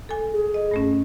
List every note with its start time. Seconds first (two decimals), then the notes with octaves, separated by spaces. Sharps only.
0.09 A4 G#5
0.33 G#4
0.54 D#5
0.71 G2 A3 C#4